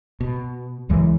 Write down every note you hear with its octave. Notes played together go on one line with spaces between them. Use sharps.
B2
C#2 F#2 E3 G#3